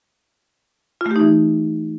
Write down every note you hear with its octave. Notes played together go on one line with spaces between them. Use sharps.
E3 A3 D#4 F4 G4